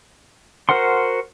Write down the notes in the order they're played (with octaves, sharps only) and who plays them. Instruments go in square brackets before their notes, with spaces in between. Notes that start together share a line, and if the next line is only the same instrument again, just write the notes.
[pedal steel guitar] F#4 A#4 C5 F#5 C6